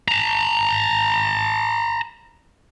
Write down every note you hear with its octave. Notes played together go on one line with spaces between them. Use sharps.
A5 A#5